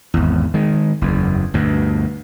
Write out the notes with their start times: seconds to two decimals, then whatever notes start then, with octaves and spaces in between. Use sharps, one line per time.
0.14 G#1 E2
0.54 D#3 G#3
1.02 F#1 E2
1.54 D2 G2 B2